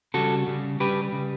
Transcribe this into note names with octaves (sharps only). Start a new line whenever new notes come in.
C#3 G3 F#4 A4
C#3 G3
C#3 G3 G4 B4
C#3 G3